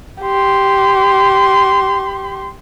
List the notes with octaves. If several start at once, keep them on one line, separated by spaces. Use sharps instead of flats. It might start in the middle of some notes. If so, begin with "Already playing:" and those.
G4 C6